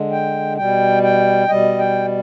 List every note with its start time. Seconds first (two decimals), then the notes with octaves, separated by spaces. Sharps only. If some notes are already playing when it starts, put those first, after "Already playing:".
Already playing: D3 G#3
0.12 G5
0.57 B2 G3 G5
1.03 G5
1.48 B2 G3 D#5
1.79 G5